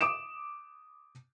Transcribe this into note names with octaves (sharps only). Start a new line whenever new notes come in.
D6 D#6 D7 E7